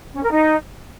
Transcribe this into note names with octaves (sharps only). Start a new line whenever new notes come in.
C#4
A#4
D#4